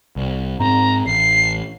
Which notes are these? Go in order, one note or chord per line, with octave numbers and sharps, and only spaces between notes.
C2
G#2 C4 A#5
A1 C7